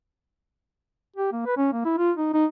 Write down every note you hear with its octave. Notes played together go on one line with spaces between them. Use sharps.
G4
A#3
B4
C#4
A#3
E4
F4
D#4
D#4